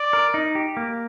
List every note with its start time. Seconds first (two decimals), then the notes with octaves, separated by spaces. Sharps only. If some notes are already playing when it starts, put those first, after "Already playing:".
Already playing: D5
0.13 A#4
0.34 D#4
0.55 G4
0.77 A#3